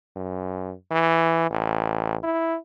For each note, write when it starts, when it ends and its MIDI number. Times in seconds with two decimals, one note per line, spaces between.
0.16 0.73 42
0.91 1.49 52
1.51 2.16 33
2.23 2.56 64